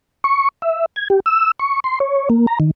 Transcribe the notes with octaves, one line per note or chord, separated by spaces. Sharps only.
C#6
E5
G#6
G4
E6
C#6
C6
C#5
A#3
A#5
D#3